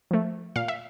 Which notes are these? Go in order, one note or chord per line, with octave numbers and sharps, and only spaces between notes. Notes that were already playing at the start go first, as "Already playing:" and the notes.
F3 A3
A#2 F5
E5